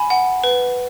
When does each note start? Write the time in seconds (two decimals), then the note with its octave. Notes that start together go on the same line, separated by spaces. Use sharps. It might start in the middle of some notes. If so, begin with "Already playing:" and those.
Already playing: G#5 B5
0.10 F#5
0.44 B4